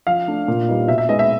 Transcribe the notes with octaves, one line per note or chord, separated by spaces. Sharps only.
F3 F5
A3 D4
A#2
G3 B3 D#4
B2 E5
E5
G#3 B3 D#4 D#5
E5